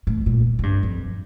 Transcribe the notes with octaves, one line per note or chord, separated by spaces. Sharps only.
A2
A#2
A2
G2
F2